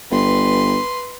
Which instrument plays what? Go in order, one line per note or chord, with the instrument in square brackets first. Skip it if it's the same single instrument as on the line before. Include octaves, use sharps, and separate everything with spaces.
[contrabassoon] G1 [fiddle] B4 C6